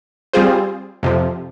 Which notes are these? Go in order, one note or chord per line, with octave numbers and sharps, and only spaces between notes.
G3 C4 F4 G#4 C5
F2 C3 F3